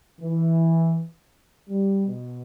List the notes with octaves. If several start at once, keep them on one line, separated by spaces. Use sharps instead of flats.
E3
G3
B2